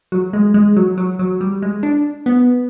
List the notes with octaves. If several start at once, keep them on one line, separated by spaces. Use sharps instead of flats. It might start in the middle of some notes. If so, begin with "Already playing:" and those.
F#3
G#3
G#3
F#3
F#3
F#3
G3
G#3
D4
B3